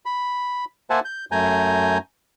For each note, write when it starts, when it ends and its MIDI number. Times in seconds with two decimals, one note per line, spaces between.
0.05 0.65 83
0.90 1.00 58
0.90 1.00 72
0.90 1.00 76
0.90 1.00 78
0.90 1.00 80
0.90 1.00 81
1.05 1.25 91
1.32 1.98 42
1.32 1.98 57
1.32 1.98 80
1.32 1.98 82
1.32 1.98 91